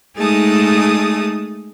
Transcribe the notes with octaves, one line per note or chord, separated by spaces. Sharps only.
G#3 A3 D#4 G#4 A5 D#6